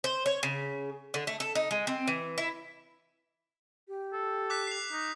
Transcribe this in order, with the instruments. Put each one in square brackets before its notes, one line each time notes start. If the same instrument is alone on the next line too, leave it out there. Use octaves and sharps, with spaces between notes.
[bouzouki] C5
C#5
C#3
D3
A3
A4
D#4
G#3
C4
E3
E4
[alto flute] G4
[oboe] A4
[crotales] D6 F#6 B6
C7 F7
[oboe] D#4